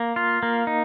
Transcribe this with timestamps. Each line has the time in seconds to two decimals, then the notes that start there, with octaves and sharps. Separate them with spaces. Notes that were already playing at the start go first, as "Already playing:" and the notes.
Already playing: A#3
0.16 F4
0.43 A#3
0.67 D#4